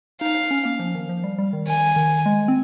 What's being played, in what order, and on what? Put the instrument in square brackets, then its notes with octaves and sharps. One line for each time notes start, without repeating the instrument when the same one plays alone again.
[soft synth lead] D#4 [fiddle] F5
[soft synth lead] C#4
A#3
F3
D#3
F3
G3
G3
D#3
[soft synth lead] D#3 [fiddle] G#5
[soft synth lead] D#3
G#3
C4